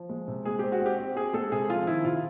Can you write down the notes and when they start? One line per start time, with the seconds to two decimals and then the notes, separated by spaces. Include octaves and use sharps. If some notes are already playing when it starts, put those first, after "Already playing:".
Already playing: F3
0.09 G#3
0.28 C3
0.45 G#3 G#4
0.59 C4 G4
0.72 F#4
0.80 C4
0.86 G4
0.98 C4
1.16 C4 G#4
1.33 G#3 A4
1.52 C3 G#4
1.69 F3 F4
1.87 D#3 E4
2.04 C3 F4